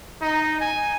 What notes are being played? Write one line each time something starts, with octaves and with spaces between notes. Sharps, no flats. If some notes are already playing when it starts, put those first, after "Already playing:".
D#4
G#5